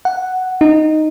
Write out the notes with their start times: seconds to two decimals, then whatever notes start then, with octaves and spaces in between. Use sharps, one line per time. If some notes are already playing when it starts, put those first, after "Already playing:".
0.05 F#5
0.61 D#4